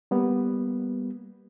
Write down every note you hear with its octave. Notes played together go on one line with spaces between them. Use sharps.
G3 A#3 B3